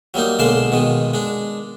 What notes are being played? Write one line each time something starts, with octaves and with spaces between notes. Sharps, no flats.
F#3 G3 A#3 D#4
B1 D3 G#3 A#3 A5 C6
B2 D#3 G#3
G#3 D4